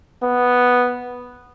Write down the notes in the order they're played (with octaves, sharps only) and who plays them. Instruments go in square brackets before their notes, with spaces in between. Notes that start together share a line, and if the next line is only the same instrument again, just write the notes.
[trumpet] B3